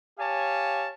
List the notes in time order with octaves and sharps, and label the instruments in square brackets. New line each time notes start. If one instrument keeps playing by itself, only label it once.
[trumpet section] G4 C#5 F5 G#5 A5